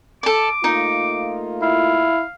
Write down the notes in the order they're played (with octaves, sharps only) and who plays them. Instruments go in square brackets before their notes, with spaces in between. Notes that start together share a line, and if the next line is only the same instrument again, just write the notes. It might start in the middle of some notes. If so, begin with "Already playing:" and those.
[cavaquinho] A4 D5 [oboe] D6
[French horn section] A3 A#3 F4 [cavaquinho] D#4
[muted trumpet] E4 [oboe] F5